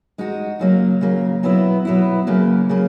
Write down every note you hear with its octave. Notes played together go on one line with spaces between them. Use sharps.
G#3 D#4 F#4
C#3 F#3 A#3
C#3 F#3 A#3
B2 F#3 B3 E4
B2 F#3 B3 E4
C#3 F#3 A#3
C#3 F#3 A#3